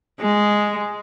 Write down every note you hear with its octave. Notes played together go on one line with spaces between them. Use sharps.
G#3